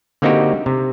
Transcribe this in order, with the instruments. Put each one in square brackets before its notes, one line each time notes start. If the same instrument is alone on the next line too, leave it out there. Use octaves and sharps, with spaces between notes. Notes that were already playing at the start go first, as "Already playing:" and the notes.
[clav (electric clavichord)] D3 A#3 C4 D#4 F#4 G4
C3